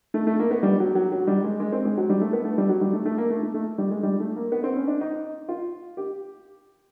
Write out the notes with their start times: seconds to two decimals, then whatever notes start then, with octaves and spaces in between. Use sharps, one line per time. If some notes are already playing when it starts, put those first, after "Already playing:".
0.14 A3
0.27 A3
0.39 A#3
0.51 B3
0.63 G3
0.80 F#3
0.95 F#3
1.12 F#3
1.27 G3
1.44 G#3
1.60 G#3
1.72 C4
1.85 G#3
1.97 F#3
2.09 G3
2.21 A3
2.33 B3
2.45 A3
2.58 G3
2.69 F#3
2.81 G3
2.93 A3
3.05 A3
3.18 A#3
3.30 A3
3.43 A3
3.54 A3
3.78 G3
3.91 G#3
4.03 G3
4.20 A3
4.36 A#3
4.52 B3
4.64 C4
4.76 C#4
4.88 D4
5.01 D#4
5.48 F4
5.97 G4